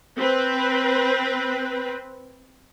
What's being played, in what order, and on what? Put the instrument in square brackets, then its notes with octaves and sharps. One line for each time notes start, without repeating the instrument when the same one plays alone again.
[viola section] C4 B4